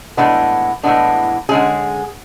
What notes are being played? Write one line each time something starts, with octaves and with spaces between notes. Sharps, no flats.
A2 E3 G#3 B3 D4
A2 E3 G#3 B3 D4
D3 G#3 C#4 G#4